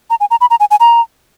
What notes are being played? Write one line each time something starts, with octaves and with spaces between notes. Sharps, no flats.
A#5
G#5
A#5
B5
A#5
G#5
G#5
A#5